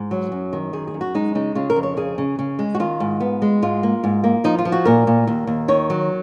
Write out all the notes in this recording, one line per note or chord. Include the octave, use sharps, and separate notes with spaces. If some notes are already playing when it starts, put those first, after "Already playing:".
Already playing: G#2
F#3
F#2
D#3
F#2 G#4
G#4
F#2
F#4
G#3 D#4
C#3 D#4
C#3 F4
A#4
F2
C#5
C#3 G#4
C#3
C#3
G#3
F#4
D#3 F4
G#2
B3
G#3
G#2 F4
A#3
G#2
A#3
F3 D#4
F4
F3
F#4
A#2 A#4
A#2
D#2
D#2
D#3 C#5
F#3